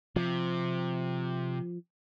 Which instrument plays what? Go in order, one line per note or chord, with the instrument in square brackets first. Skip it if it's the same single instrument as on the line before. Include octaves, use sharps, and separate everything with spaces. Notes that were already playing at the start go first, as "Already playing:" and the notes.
[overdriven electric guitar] C3 [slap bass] F3